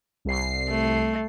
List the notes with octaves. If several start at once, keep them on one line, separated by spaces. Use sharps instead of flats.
C2 C7
A3